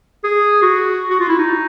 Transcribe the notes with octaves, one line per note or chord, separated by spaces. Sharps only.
G#4
F#4
F#4
F4
E4
D#4